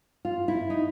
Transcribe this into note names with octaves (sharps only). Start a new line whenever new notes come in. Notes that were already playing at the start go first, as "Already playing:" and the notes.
F4
E4
D#4